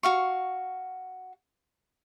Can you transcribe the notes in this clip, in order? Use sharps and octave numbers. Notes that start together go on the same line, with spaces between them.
F#4 F5 C#6